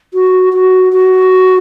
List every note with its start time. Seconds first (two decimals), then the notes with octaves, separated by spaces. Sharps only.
0.14 F#4
0.53 F#4
0.93 F#4